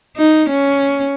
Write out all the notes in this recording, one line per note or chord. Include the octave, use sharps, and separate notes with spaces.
D#4
C#4